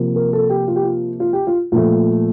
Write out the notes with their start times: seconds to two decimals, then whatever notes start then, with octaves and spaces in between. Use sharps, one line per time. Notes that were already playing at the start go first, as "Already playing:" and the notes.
Already playing: C3 F3 A#3
0.16 A#4
0.33 A4
0.50 G4
0.68 F4
0.76 G4
0.83 F4
1.20 F4
1.33 G4
1.47 F4
1.72 A#2 F3 A3 F4